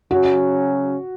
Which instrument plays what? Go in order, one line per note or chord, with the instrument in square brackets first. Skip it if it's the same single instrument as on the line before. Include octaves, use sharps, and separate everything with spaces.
[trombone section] C#3 F#3 C#4 [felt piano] F#4